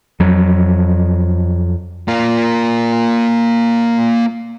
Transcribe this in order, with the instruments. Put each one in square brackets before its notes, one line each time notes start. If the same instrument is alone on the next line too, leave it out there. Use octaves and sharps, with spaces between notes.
[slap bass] F2 F#3
[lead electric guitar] A#3 F4